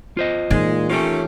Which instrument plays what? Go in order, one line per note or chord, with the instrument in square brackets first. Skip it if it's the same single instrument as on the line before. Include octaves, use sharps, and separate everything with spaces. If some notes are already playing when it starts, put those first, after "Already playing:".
[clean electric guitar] F4 C5 D#5
[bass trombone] A#2 [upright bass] E3 D#4 [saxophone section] G#3
[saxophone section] D#3 A3 C#4 [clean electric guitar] F4 G4 A4